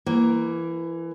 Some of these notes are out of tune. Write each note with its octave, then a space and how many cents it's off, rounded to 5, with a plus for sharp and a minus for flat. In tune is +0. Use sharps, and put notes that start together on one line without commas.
E3 +20 A#3 +0